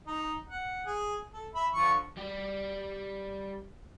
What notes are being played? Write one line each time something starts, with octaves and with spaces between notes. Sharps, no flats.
D#4 D#5
F#5
G#4
A4
E5 B5
D3 F3 C#6
G3 G4